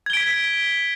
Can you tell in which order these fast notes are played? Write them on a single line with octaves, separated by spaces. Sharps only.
G#6 G7 D7 B6